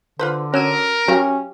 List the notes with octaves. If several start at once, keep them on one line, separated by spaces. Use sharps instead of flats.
D3 F4 B4 C5
C#4 F#4 A#4 E6 D#7
F#3 C#4 G4 F5